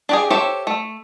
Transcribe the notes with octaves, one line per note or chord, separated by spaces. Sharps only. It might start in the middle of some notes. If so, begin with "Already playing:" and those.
D4 G4 G#4
G4 A4 C5 C#5 E5
A3